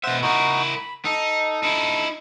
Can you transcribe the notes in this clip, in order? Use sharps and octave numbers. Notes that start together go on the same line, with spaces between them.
B2 C5 E5 F#5
D#4 E4 F#4 A#4
B5
D#4 A4
D#4 E4